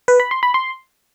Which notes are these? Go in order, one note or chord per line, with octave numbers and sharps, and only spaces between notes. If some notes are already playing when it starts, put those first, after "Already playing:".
B4
B5
C6
B5
C6